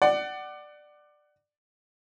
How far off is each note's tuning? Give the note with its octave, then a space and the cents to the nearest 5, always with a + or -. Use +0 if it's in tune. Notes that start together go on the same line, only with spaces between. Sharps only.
D5 +15 F#5 +25